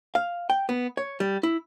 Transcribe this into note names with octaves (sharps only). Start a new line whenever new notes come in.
F5
G5
B3
C#5
G3
E4